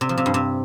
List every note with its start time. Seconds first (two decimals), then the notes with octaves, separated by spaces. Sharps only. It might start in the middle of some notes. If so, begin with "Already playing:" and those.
0.01 C3
0.09 F3
0.17 C3
0.26 G2
0.34 C3